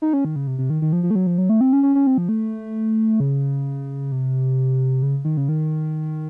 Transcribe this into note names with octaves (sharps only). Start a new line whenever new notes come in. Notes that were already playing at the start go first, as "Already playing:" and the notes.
D#4
C#4
D#3
C#3
C3
C3
D#3
D#3
F3
F3
A3
F#3
F3
F#3
A3
C4
C#4
C#4
C#4
C4
F3
A3
C#3
C3
C#3
D#3
C#3
D#3